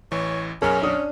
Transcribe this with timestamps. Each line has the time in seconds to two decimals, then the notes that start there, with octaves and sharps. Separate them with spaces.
0.12 A1 E3 C#5
0.62 B1 F#2 C#4 G#4 A#4 G#5 F6
0.82 D4 D#6